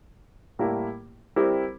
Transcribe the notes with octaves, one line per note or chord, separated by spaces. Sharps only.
A2 G3 A#3 E4 A#4
G3 C4 E4 G4 A#4